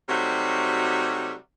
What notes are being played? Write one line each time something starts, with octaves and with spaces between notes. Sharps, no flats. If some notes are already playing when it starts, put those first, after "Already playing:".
C3 F#3 G3 A3 D#4 F#4